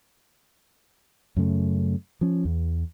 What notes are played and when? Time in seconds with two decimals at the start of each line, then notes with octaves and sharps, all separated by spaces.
1.37 F#2 C#3 A3
2.21 F3 C#4
2.45 E2